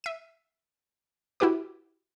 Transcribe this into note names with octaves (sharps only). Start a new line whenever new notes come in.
E5 D#7
E4 F#4 G4 B4 D6